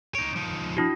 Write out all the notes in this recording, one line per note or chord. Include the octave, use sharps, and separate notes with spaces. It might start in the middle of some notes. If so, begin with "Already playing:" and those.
D#4 C#5 D7
F3 D#4
D4 E4 F#4